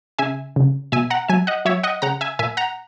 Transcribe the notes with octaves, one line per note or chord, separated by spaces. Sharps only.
C#3 E5 G#5
C#3
B2 E5 G#5
F#5 A#5
F#3 E5 G#5
D#5 F#5
F#3 C#5 E5
D#5 F#5
C#3 F#5 A#5
E5 G#5
A#2 E5 G#5
F#5 A#5